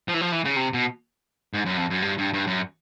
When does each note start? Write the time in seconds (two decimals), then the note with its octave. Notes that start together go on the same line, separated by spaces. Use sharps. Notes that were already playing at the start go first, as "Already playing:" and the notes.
0.08 F3
0.14 E3
0.21 F3
0.32 E3
0.45 C#3
0.56 C3
0.74 B2
1.54 G#2
1.66 F#2
1.77 F2
1.90 F#2
2.02 G2
2.18 G2
2.33 G2
2.47 F#2